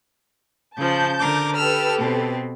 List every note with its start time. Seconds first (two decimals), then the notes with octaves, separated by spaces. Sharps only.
0.76 C#3 F3 A5 G6
1.20 D3 A#4 D6
1.56 G4 A4 B4 E6 F6
1.97 B2 C4